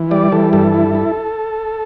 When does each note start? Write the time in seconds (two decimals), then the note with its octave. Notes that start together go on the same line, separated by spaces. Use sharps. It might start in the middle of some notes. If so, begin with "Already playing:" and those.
Already playing: E3
0.11 G3 D5
0.32 E3 A4
0.53 G2 A4
0.74 E4
0.95 E4